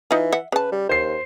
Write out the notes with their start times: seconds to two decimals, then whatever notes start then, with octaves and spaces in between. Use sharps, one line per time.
0.11 E3 D#4 F4
0.32 E5 F#5
0.52 C#3 B4 A5
0.72 G3
0.89 D#2 C5 C7